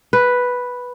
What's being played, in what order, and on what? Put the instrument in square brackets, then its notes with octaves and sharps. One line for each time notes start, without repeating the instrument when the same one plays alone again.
[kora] B4